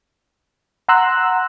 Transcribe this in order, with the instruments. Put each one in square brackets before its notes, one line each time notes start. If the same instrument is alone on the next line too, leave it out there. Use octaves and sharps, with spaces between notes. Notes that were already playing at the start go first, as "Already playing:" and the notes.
[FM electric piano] F#5 A#5 C6 E6 F#6